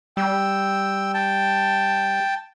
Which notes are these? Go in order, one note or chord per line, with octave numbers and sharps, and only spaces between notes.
G3 G5 E6
G5 A5